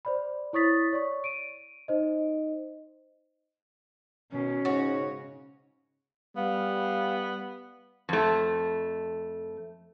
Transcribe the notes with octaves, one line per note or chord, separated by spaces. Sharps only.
C5 D5 B5
E4 C#5 C#6 D#6 A6 B6
C#5 D5 C#6
D7 D#7
D#4 C5 D#5
B2 D#3 C#4
G#2 C#3 F#4 C#5
G3 B3 F5
F2 A3